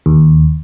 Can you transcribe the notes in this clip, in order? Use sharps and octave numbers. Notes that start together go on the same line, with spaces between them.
D#2